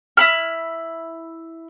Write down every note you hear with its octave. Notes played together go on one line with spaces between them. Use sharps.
E4 B5 F6